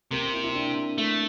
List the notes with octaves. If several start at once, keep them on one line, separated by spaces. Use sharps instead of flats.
C3 A#3
C4
E4
E4
D4
A3